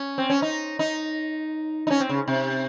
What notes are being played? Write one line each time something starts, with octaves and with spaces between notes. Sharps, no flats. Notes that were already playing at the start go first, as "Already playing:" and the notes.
Already playing: C#4
C4
C#4
D#4
D#4
D#4
C#4
C4
C#3
C3